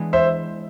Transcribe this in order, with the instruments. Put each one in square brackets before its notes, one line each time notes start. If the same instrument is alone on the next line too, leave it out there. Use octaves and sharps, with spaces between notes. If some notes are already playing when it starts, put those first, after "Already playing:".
Already playing: [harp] E3 G#3 B3 D4 G#4
[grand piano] C5 E5